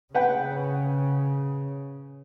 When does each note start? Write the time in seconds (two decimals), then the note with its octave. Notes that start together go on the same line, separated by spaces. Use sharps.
0.14 C#3 B4 F#5 G5